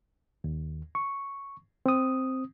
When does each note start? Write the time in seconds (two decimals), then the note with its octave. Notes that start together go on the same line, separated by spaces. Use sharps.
0.44 D#2
0.95 C#6
1.86 C4 D#6